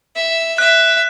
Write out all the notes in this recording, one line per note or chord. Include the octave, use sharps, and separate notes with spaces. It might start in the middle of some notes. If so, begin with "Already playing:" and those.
E5
E5 F#6